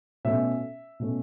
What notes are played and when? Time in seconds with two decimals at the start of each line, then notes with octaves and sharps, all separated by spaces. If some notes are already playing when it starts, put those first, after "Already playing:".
0.25 B2 A3 C#4 E5
1.00 B2 A3 C#4